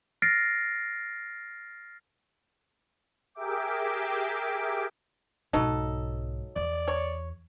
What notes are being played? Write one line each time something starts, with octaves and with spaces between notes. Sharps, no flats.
F6 A6 A#6 C7 D7
G4 G#4 A#4 E5 G5 D6
B1 G#2 F#3 D#4 A4
E2 D5
C#5